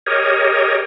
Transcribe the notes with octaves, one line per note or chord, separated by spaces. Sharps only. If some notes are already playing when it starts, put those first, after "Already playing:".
G4 G#4 A#4 C#5 D#5